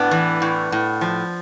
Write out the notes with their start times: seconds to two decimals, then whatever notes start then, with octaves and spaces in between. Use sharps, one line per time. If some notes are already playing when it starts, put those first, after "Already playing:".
Already playing: A2 B3 D4
0.11 E3
0.42 A2
0.72 A2
1.01 F3